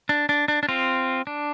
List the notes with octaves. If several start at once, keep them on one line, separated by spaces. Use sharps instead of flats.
D4
D4
D4
D4
C4 F4
D4